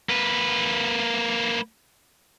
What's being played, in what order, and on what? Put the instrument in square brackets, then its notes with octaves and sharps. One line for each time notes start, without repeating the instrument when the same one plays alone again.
[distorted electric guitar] A#3 B4